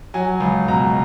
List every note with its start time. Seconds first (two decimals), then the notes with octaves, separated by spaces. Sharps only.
0.14 F#3 G#5
0.40 C#2
0.68 B2 A#5